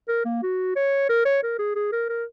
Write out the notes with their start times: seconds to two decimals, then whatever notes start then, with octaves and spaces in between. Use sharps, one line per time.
0.08 A#4
0.25 A#3
0.43 F#4
0.76 C#5
1.09 A#4
1.25 C#5
1.43 A#4
1.59 G#4
1.75 G#4
1.92 A#4
2.09 A#4